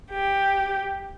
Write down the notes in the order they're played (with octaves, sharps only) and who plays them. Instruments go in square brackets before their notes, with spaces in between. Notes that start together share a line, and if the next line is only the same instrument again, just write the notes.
[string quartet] G4